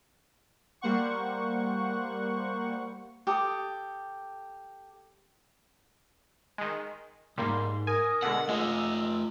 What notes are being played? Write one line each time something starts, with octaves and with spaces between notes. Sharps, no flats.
G3 A#3 C5 F#5 C#6
G4 A4 D#6
D#3 G#3
C2 G#2 G3 A#3 C6
A#4 G#5 D#6
B2 D3 G#3 F#5 E6
G#3 A3 F4 D#5